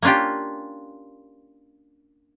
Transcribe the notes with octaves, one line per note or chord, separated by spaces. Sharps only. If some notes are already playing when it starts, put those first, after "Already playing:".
A#3 C#4 D4 F4 G4